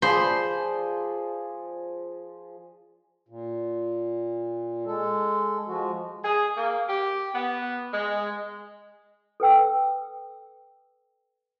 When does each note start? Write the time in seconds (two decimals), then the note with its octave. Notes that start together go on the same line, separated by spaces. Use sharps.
0.02 F3 G#4 C5 D5 B5 C6
3.29 A#2
4.86 G#3 A4
5.67 F3 G#3 F#4
6.24 G#4
6.57 A#3
6.88 G4
7.34 B3
7.93 G#3
9.40 A4 B4 G5 E6